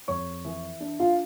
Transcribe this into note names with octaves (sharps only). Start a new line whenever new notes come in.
F2 C#5 C#6
E3
D4
F4 F5